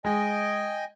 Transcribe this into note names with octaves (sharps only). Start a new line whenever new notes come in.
G#3 D#5 G5 G#5